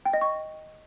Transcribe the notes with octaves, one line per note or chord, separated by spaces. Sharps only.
G5
D#5
C#6